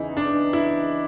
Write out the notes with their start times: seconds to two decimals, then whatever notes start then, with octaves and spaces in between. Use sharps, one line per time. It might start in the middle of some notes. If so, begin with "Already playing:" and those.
Already playing: E2 C#3 E3 D#4 E4
0.17 D4
0.53 E4